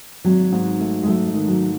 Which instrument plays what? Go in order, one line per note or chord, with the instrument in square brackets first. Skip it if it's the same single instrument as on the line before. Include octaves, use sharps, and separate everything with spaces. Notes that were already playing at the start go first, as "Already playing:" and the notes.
[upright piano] G#1 [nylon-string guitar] F#3
[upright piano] G#2
A3
[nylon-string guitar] G#3
[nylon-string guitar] F#3 [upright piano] A3
[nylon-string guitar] G#3
[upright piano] D#3
[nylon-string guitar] F#3